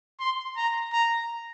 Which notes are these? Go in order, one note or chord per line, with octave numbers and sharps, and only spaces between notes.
C6
A#5
A#5